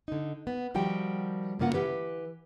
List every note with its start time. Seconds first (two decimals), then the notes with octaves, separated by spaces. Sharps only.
0.08 D3 D#4
0.47 B3
0.74 D#3 F3 G3 F#4 G5
1.59 G2 C#3 A#3 F4 F#5
1.74 E3 G4 B4